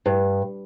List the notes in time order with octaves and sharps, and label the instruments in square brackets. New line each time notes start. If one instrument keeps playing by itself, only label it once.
[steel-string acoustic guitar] G2